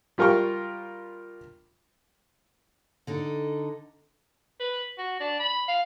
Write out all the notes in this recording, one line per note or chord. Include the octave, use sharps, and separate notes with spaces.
G3 F4 A#4 G5 C#6
D3 D#4 A4
B4
F#4
D4
B5
F5